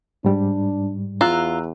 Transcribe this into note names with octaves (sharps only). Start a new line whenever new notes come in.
G#2 G3 D4
E2 F4 A#5 E6 F#6